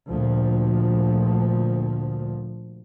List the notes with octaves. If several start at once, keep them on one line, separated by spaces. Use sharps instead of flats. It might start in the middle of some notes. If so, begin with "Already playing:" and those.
D2 A#2 F3